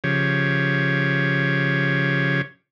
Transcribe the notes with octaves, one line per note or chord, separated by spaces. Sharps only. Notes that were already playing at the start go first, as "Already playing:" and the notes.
C#3 F3 G4 C#5